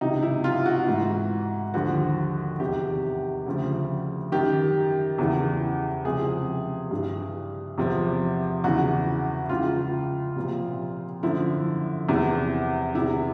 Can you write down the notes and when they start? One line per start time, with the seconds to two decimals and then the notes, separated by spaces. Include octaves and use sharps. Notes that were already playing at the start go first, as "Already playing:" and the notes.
0.01 C#2 C3 E3 D#4
0.23 E4
0.44 F4
0.66 F#4
0.87 G#2 E3
1.74 D#2 D3 F3 F#4
2.60 E2 C3 D#3 G4
3.46 D2 C#3 F3
4.32 F#2 D#3 G4
5.18 E2 C#3 E3
6.05 C#2 C3 F3 G#4
6.91 G2 E3
7.78 E2 C3 F3
8.64 E2 C#3 E3 F#4
9.49 C#2 C#3 E3 F4
10.36 C2 A#2 F3
11.23 F#2 D3 F3 E4
12.09 E2 C3 E3
12.95 E2 C3 E3 E4